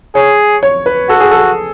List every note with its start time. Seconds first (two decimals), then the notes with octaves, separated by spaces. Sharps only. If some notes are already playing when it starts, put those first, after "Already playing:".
0.15 G#4 C#5
0.63 C#5
0.86 B4
1.09 F#4 A4
1.20 G#4
1.31 A4